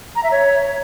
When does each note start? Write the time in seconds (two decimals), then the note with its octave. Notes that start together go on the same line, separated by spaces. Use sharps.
0.16 A#5
0.23 E5
0.31 C#5